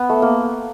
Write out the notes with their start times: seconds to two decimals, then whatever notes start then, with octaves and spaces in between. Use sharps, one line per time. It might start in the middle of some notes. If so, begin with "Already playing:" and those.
Already playing: B3
0.09 A3
0.22 A#3